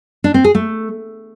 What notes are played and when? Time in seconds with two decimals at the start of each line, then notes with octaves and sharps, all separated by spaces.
0.24 D4
0.34 C4
0.44 G#4
0.55 A3